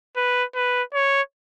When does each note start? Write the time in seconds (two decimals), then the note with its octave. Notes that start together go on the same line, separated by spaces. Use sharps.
0.16 B4
0.55 B4
0.94 C#5